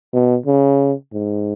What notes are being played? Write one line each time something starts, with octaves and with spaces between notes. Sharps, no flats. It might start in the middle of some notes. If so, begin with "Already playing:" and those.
B2
C#3
G#2